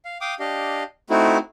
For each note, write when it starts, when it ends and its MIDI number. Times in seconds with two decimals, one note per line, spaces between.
0.05 0.18 77
0.21 0.35 77
0.21 0.35 79
0.21 0.35 86
0.21 0.35 87
0.40 0.83 62
0.40 0.83 67
0.40 0.83 75
0.40 0.83 77
1.10 1.38 57
1.10 1.38 60
1.10 1.38 63
1.10 1.38 64
1.10 1.38 66